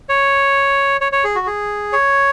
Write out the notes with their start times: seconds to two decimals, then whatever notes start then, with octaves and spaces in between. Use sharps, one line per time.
0.09 C#5
1.01 C#5
1.12 C#5
1.24 G#4
1.35 F#4
1.47 G#4
1.93 C#5